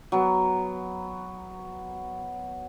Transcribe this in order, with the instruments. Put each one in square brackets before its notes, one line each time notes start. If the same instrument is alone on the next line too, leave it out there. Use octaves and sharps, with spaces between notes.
[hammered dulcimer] F#3 B3